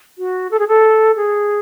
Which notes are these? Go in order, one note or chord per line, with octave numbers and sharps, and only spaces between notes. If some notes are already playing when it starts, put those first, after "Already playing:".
F#4
A4
G#4
A4
G#4